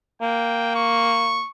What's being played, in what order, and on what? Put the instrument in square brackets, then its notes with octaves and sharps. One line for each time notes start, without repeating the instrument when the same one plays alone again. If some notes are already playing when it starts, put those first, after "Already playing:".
[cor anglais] A#3 [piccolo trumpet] G5
[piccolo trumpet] C#6